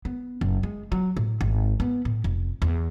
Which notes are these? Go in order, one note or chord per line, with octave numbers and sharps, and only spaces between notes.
B3
F#1
G#3
F#3
A2
G#1
B3
A2
F1
E2